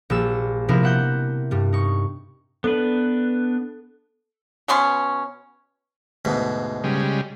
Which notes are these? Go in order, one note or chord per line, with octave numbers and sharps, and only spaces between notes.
A#1 G3 E6
C3 F3 B3 D4 E4 A#4
E5 F#5 G6
G2 G3
D#4 C#6
B3 D4 A4 B4
B2 B3 C#4 C6
D2 G#2 B2
C#3 G3 G#3